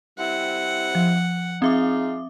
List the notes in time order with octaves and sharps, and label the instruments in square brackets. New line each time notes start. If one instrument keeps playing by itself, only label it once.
[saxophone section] G3 C4 E4 [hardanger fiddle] F#5
[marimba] F3
[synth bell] C4 E5 D6 [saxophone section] D#4 F4 G#4